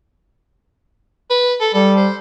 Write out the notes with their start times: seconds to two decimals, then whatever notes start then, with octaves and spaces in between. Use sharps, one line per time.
1.30 B4
1.61 A4
1.74 G3 A4
1.97 C5